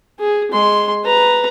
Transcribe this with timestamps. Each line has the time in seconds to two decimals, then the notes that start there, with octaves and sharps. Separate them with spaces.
0.19 G#4
0.51 G#3 C6
1.04 B4 A#5